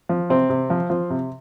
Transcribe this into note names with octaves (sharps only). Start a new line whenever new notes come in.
F3
C3 C4
C3
F3
F3
C3